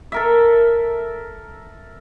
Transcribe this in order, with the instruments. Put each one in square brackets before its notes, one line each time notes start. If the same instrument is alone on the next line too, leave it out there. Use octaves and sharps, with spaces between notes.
[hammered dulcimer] A4 A#4 E5